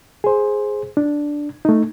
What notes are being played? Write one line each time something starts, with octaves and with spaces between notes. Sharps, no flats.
G#4 C5
D4
A3 D#4